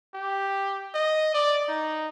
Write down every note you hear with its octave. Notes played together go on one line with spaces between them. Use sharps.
G4
D#5
D5
D#4